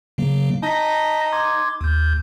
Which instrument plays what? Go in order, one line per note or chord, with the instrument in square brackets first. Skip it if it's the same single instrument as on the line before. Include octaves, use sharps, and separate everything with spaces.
[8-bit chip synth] C#3 F#3 A#3
[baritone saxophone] D#4 [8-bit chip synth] A5 A#6 B6
[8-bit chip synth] C6 D6 G#6
D#2 G6